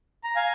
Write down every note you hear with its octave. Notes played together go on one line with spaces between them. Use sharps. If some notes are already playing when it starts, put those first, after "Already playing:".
A#5
F5 G#5